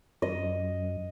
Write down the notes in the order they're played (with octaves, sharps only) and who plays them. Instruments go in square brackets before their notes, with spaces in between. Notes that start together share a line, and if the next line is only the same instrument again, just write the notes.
[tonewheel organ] F#2 [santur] D#5